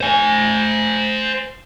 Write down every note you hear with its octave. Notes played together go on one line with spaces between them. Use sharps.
C5 G#5